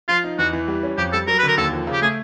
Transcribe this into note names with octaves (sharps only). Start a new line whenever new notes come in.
F3 F4
D#4
E2 F#4
E3
G3
C#4
F2 G4
G3 A4
F#3 A#4
B4
D3 A#4
D#2 A4
F3
C#3
G4
A3 G#4